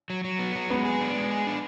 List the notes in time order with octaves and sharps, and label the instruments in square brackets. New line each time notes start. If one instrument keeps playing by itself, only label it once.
[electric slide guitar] F#3
F#3
B3
F#3
[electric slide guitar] G#3 [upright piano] B3
[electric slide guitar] G#4
D4
G#3
G#4
D4